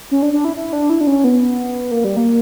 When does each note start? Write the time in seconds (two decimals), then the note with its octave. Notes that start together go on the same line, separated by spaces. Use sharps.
0.11 C#4
0.22 D4
0.33 D4
0.45 E4
0.56 E4
0.73 D4
0.90 E4
1.01 D4
1.07 C#4
1.24 B3
1.91 A#3
2.04 G3
2.17 A#3